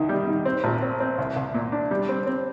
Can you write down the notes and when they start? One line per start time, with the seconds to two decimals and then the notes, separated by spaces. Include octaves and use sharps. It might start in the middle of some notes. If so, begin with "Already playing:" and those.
Already playing: C2 D#3
0.09 G3
0.27 D#3
0.45 C4
0.64 A#1
0.82 C4
1.00 C4
1.18 C2
1.36 C2
1.54 A#2
1.72 D4
1.91 G3
2.09 C4
2.27 C4